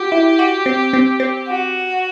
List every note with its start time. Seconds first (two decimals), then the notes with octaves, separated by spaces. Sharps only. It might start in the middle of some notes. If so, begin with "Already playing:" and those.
Already playing: F#4 G4
0.12 E4
0.39 F#4
0.66 C4
0.93 C4
1.20 C4
1.48 F#4